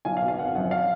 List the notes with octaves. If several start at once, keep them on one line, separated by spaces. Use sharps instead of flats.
B1 F5 G#5
F5
B2
F5
G#1 F#5
F#2 F3 F#5
F5